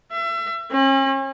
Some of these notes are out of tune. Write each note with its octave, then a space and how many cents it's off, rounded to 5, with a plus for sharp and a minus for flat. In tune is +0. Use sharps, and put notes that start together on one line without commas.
E5 +35
C#4 -40